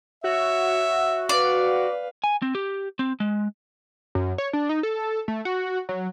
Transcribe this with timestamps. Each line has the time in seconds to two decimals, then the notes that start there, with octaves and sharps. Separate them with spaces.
0.24 F#4 C#5 E5
1.29 B4 D5 F5
2.24 G#5
2.42 C4
2.55 G4
2.99 C4
3.20 G#3
4.15 F#2
4.38 C#5
4.53 D4
4.69 D#4
4.83 A4
5.28 A3
5.45 F#4
5.89 F#3